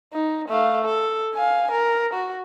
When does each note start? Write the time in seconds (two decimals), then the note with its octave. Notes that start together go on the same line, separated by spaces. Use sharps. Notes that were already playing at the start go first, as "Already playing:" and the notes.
0.13 D#4
0.49 A3 F5
0.85 A4
1.34 F5 G#5
1.71 A#4
2.14 F#4